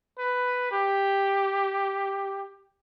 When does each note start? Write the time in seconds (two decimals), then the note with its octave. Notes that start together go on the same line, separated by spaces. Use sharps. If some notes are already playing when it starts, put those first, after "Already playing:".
0.18 B4
0.72 G4